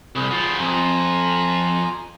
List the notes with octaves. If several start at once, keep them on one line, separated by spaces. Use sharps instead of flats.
C2 G#4 B5
F#3 F4
F2 F4 G#5 A#5